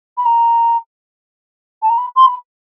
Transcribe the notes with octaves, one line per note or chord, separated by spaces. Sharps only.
B5
A#5
A5
A#5
B5
C6
B5